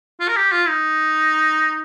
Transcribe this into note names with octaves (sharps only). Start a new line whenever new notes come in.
F4
A#4
G4
F4
D#4